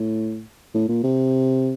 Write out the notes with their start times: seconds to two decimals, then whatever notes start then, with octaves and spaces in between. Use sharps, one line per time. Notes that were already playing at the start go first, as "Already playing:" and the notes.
Already playing: A2
0.74 A2
0.88 A#2
1.03 C3